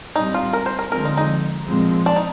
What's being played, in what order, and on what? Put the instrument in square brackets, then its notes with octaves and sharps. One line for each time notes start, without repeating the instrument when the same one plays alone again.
[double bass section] A#2 G3 C4 [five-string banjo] D#4
[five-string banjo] F4
A#4
C5
A#4
[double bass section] D3 F3 G#3 C4 [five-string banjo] A#4
[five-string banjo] D#4
D#4
[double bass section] A#2 F3 G#3 C4
[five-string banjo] D4
D#4